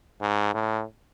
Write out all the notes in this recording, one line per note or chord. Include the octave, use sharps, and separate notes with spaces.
G#2
A2